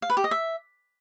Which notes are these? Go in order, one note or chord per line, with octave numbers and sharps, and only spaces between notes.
F5
B4
G4
D#5
E5